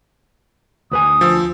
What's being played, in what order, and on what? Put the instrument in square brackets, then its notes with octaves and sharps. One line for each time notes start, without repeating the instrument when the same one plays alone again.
[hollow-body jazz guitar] D2 B4 G#5 [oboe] D#6
[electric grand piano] F3 E6